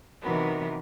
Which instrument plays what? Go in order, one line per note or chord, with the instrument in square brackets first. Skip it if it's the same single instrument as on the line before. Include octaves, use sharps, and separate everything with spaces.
[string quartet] C3 D#3 E3 F#3 B3 A#4